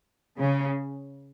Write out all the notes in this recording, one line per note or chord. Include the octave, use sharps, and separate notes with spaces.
C#3